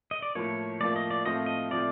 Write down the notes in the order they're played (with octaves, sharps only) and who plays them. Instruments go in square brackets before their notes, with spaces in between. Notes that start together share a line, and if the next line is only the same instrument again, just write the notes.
[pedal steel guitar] D#5
D5
[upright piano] A2 F3 A#3 [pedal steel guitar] C#5
[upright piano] A2 F3 A#3 [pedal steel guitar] D5
[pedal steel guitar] D#5
D5
[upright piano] A2 F3 A3 C4 F4 [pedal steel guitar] D#5
[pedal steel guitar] D#5
[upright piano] A2 F3 A3 C4 F4 [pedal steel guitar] D5